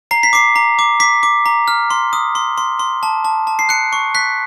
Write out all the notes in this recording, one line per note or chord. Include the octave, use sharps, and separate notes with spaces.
A#5 C7
B6
D6 C7
A#5
D6
D6 B6
D6
A#5
F6
C6
D#6
C6
C6
C6
A5
A5
A5
C7
F#6 C#7
C#6
F#6 B6